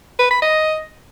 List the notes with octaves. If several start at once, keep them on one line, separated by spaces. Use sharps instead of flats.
B4
B5
D#5